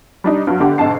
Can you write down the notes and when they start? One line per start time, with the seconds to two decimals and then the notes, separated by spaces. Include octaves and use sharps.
0.24 G3 D4 D#4
0.47 G2 F#3
0.59 G1 D3 G4 F#5
0.78 B1 G#2 D3 A5 C7